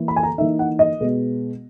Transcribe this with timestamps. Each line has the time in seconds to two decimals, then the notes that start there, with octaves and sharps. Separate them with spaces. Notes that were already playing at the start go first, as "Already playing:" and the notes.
Already playing: E3 A#3 E4
0.08 B5
0.16 G#5
0.23 A#5
0.38 E3 A#3 D#4 E5
0.59 F#5
0.79 D#5
1.00 B2 G#3 B3